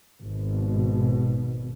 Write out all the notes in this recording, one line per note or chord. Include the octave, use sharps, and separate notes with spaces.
G#1 B2